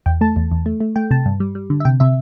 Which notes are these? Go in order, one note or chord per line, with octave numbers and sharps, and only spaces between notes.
E2 G5
A3 A5
E2
E2
A3
A3
A3 G5
C3 A5
G2
G3
G3
D3
E5
C3 G5
C3 E5